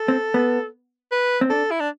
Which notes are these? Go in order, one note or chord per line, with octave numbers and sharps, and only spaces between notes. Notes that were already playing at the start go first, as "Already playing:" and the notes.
Already playing: A4
C4
B3
B4
C4
D4 A4
E4
D4